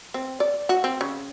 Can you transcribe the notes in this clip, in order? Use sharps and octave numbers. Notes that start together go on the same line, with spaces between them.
C4
D5
F#4
C4
C#3